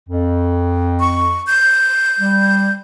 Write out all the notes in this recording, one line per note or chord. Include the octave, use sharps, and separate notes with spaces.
F2
C#6
G6
G3